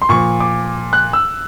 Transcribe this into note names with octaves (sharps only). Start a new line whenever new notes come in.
C6
A#2 F3 C#6
D6
F#6
E6